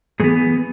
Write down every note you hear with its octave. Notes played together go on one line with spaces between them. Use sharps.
A2 E3 B3 G#4